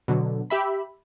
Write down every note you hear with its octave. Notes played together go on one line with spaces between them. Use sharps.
B2 D3 F#3
G4 E5 B5